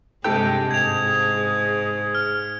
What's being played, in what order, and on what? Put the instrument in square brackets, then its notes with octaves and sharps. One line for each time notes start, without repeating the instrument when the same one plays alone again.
[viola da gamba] G2 C3 G#3 [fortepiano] G4 A4 G5
[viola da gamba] G#2 [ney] G#4 [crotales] G#6 F7
[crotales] F6